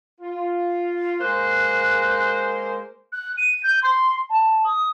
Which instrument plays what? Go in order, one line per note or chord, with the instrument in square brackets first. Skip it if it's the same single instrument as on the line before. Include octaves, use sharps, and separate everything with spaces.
[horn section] F4
[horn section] G#3 A#3 C5 [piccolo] F#6
[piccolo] F#6
D#7
G6
C6
A5
D#6